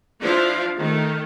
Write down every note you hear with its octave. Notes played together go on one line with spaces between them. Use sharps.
F3 D4 E4 F4 F5
D#3 A3